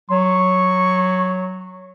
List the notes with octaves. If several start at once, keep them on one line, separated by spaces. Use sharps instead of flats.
F#3 C#6